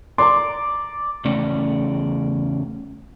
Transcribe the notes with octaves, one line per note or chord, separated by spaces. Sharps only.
D5 A#5 C6
E2 C#3 A3 C#4 D5